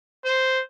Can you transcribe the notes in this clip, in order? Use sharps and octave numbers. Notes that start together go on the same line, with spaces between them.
C5